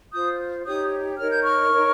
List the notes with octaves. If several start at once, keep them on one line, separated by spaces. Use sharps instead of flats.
F4 C5 D#6 G6
D#4 G4 C#5 D#6 G6
D#4 A#4 C#5 F6
G6
C#6 F6
D#4 A#4 C#5